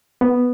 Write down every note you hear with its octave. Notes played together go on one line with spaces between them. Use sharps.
B3